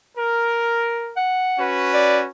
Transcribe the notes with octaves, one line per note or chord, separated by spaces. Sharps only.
A#4
F#5
C#4 F#4 B4
D5